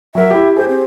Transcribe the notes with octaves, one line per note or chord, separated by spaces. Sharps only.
F#3 A#4 E5
E4 G4
G4 G#4 C5
C4